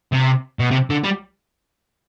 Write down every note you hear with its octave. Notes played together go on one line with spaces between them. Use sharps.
C3
B2
C3
D3
G3